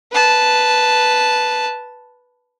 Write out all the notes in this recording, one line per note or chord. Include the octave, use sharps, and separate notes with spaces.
B4 A5